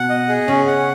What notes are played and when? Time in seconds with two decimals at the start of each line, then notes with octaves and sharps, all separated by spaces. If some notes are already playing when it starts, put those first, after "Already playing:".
Already playing: B2 F#5
0.09 D#5
0.29 G#4
0.47 C#3 C#4
0.67 F#5